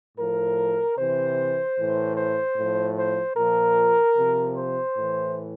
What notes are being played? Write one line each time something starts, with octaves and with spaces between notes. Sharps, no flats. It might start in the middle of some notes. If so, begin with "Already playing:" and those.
A2 F3 A#4
C3 E3 C5
A2 E3
C5
A2 F3
C5
A#2 F3 A#4
C3 F3
C5
A2 E3